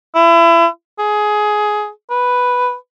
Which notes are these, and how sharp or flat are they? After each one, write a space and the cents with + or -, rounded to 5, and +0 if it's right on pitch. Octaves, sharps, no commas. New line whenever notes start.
E4 +30
G#4 +15
B4 +0